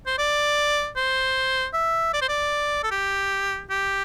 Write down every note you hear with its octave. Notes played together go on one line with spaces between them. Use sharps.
C5
D5
C5
E5
D5
C5
D5
A4
G4
G4